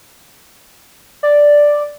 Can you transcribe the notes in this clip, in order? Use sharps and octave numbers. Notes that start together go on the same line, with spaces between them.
D5